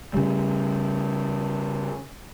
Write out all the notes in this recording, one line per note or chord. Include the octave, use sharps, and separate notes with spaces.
C#3 G3